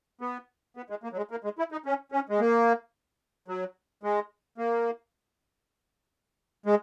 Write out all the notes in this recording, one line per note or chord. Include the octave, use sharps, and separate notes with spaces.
B3
B3
G#3
A#3
F#3
G#3
A#3
G#3
E4
D#4
C#4
C#4
G#3
A#3
F#3
G#3
A#3
G#3